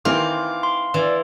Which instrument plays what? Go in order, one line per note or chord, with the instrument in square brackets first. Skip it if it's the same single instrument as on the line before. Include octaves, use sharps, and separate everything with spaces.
[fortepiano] D#3 E3 C4 [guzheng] F4 [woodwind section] D6
[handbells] C6
[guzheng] E3 [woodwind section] D5